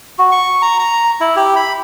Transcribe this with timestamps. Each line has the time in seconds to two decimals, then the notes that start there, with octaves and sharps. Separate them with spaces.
0.18 F#4
0.32 C#6
0.62 A#5
0.79 A#5
1.20 E4
1.36 G4
1.56 B5